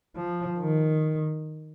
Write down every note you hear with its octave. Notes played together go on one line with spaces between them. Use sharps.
F3
D#3